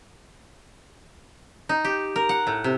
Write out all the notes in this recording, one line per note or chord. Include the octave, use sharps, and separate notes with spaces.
D#4
G4
A#4
F#5
A2
C3